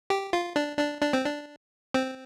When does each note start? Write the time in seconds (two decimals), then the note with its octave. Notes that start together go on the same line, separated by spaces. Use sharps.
0.10 G4
0.33 F4
0.56 D4
0.79 D4
1.02 D4
1.13 C4
1.25 D4
1.94 C4